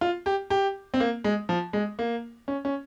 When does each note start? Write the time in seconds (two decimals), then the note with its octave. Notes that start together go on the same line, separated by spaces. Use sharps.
0.01 F4
0.26 G4
0.50 G4
0.94 C4
1.00 A#3
1.24 G#3
1.49 F3
1.73 G#3
1.99 A#3
2.48 C#4
2.65 C#4